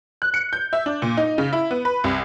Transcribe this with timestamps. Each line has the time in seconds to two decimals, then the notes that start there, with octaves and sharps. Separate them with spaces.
0.22 F#6
0.34 C#7
0.53 G6
0.73 E5
0.86 D4
1.02 A#2
1.17 D#4
1.38 C#3
1.53 E4
1.71 B3
1.85 B4
2.04 C2